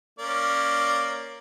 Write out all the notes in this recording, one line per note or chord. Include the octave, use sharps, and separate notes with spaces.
A#3 C#4 D5